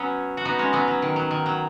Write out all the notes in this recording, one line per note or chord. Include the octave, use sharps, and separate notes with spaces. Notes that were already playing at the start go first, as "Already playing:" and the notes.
Already playing: F#3 B3 C#4
F#4
B3 D#4
G#3 C#4
F#3 B3
F#3
D#3
F#3
D#3
F#3